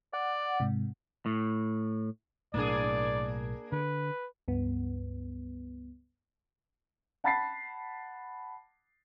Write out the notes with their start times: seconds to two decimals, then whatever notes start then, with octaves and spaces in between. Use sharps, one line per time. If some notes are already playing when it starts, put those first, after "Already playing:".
0.13 D5 F#5
0.60 G#2 C3
1.26 A2
2.54 B1 A2 A#3 D4 G#4 D5
3.72 D3 B4
4.48 C#2 G2 B3
7.24 F#5 A5 B5 A6 B6 C7